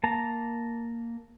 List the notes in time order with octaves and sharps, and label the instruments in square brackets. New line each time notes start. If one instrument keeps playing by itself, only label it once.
[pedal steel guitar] A#3 A5 A#5